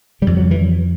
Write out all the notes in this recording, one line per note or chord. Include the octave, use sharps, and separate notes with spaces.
F2 C#3 G3
F#3
E3